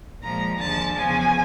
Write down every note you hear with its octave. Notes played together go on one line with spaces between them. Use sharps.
A#2 F3 G#3 A#5
D#2 D3 F3 G#3 A5
E2 C#3 F3 G#5